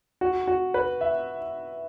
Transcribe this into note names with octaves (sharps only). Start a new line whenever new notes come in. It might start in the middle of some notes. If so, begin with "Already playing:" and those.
F#4
F#4
B4
E5